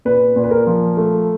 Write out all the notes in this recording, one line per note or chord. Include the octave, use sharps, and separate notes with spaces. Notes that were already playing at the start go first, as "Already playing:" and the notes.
A#2 B4
A#2
B4
A#4
F3
A3